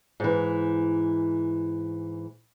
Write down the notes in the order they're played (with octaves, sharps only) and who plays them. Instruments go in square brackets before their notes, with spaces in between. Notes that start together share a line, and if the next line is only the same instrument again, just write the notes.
[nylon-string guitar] G#2 E3